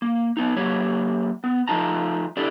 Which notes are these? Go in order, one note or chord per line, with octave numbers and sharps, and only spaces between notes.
A#3
B3 D#4
F#3 A#3 G4 C#5
B3
F3 A3 D#4 F4 A5 A#5
D4 E4 G4 A4 D5